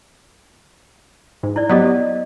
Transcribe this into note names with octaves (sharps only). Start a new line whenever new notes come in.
G#2
E4 D5
F#3 B3 G4 D5 D#5